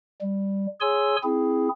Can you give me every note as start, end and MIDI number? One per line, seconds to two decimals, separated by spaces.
0.21 0.66 55
0.81 1.16 68
0.81 1.16 73
0.81 1.16 80
0.81 1.16 84
0.81 1.16 88
1.23 1.69 60
1.23 1.69 64
1.23 1.69 68